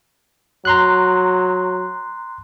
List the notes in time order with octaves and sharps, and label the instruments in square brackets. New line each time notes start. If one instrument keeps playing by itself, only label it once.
[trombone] F#3 [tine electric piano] A#5 C6 F#6